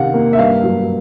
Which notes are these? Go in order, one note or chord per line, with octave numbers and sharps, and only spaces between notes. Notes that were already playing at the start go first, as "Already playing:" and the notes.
Already playing: C3 D#3 F5 F#5
A#3
E5
G2 F5
F#3